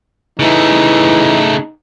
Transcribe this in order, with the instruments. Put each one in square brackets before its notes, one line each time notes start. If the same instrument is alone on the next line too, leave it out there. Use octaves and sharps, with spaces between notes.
[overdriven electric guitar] C#3 A3 [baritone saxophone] E3 [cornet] D#4